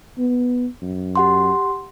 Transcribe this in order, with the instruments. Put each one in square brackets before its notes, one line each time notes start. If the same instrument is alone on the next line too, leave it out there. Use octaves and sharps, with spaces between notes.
[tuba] B3
F#2
[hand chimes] G4 F#5 C6